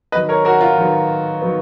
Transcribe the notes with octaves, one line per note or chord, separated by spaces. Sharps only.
D#3 F#3 B3 B4 D#5
A#4 C#5
F#4 A#4
F4
D#3 F#3 B3
D#3 F#3 B3